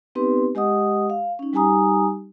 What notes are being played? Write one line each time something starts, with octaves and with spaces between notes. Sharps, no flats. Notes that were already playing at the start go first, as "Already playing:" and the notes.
B3 C4 D#4 G4 B4 C6
G#3 G4 D#5 F#5 D#6
F5
C#4 D#4
G3 D#4 G4 G#5 A#5 D#6